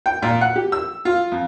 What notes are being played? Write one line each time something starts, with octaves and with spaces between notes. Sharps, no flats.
G5
A#2
F#5
G4
E6
F4
F2